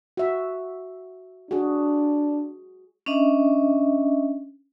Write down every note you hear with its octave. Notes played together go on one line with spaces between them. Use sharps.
F#4 E5
D4 F#4 G#4
C#4 D4 D#5 E5